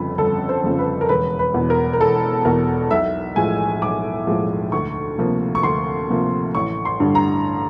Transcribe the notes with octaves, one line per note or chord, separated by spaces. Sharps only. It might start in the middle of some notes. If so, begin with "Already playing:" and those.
Already playing: G1 F2 C#3 F3 B4
G1 A4
C5
F2 C#3 F3
B4
A#4
E1 B4
B4
E2 B2
A#4
A#4
E1 A4
E2 B2 A#4
B1 E5
A2 F3 G#3 G#5
B1 D6
A2 F3 G#3
D2 C#6
C3 F3 A#3
C#6
D2 C6
C3 F3 A#3
A1 C#6
C6
G2 D3 G3
A#5